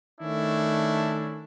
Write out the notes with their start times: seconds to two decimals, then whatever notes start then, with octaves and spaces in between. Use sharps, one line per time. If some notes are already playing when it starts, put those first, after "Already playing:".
0.21 D#3 A3 C#4 D4 E4